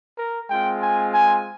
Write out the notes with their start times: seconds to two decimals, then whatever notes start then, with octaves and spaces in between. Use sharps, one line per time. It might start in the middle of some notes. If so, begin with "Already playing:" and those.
0.17 A#4
0.50 G#3 C4 F4 G5
0.82 G#5
1.14 G#5